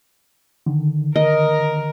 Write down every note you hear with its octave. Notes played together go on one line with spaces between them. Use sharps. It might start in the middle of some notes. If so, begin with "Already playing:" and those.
D3 D#3
A#4 D#5